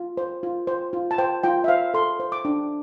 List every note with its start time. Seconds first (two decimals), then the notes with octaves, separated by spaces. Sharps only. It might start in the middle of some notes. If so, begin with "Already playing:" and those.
Already playing: F4
0.17 C5
0.43 F4
0.67 C5
0.93 F4
1.11 A5
1.18 C5 G5
1.44 F4 G5
1.64 E5
1.68 C5 F5
1.94 A4 C6
2.20 C5
2.32 D6
2.45 D4